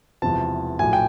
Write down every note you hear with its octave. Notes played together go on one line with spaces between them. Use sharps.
E1 E2 C3 F3 A5
A#1 A2 F#3 G#5
G5